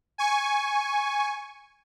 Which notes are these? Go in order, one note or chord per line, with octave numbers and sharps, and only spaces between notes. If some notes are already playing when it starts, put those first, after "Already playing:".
G#5 C#6